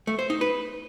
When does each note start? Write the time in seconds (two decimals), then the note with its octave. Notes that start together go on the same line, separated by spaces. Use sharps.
0.07 A3
0.19 C5
0.30 D#4
0.41 B4